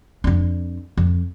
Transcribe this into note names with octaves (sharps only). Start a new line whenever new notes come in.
F2 D4
F2